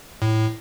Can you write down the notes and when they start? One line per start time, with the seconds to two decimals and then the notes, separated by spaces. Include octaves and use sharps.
0.22 A2